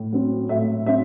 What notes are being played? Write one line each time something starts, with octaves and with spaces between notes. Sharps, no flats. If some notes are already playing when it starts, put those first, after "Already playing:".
Already playing: A2
F#3 C4
A2 E5
F#3 C4 E5